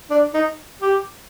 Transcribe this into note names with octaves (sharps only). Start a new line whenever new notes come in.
D4
D#4
G4